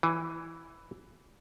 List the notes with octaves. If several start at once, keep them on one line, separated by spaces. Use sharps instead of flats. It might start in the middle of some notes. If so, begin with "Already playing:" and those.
E3